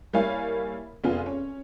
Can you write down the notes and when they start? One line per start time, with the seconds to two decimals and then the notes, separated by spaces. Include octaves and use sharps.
0.13 G3 A#3 E4 C#5 F5 G#5
1.04 F1 B3 F4 G#4
1.26 C#4